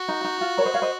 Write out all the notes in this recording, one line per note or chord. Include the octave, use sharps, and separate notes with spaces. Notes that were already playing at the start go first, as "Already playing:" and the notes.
Already playing: F#4
D#4
D#4
F4
A#4 C#5
C5 D#5
C#5 F5
C5 D#5